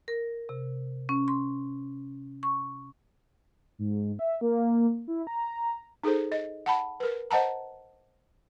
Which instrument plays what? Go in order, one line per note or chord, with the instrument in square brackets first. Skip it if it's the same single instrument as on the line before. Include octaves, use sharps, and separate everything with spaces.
[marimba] A#4
C3
C#4
C6
C#6
[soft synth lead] G#2
E5
A#3
E4
A#5
[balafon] D#4 G#4 A4 C5
D#5
F#5 A5 B5
A#4 B4
C5 D#5 F#5 A5 A#5